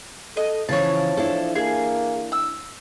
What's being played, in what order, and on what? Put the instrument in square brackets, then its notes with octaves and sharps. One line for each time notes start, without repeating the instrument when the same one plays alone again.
[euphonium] A4 [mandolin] D#5
[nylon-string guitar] C#3 E3 [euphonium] F3 [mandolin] C#5 A5
[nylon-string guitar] D4 E4 A4
[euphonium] A#3 [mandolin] G#4
[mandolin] E6